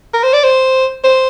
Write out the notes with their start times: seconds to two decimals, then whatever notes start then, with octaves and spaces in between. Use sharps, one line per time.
0.14 A#4
0.24 C5
0.33 D5
0.44 C5
1.04 C5